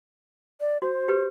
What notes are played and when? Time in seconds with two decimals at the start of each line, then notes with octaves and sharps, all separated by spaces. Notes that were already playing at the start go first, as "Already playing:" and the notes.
0.60 D5
0.82 F#4 C5
1.08 G4 B4